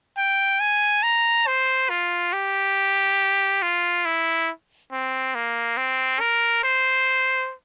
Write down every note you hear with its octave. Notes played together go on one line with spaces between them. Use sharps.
G5
G#5
A#5
C5
F4
G4
F4
E4
C4
A#3
C4
A#4
C5